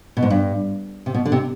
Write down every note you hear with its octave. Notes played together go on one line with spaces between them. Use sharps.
B2
G#2
G2
C3
B2
D3
C3